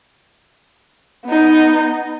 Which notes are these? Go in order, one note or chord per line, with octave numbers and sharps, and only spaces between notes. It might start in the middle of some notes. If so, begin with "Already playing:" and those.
B3 D#4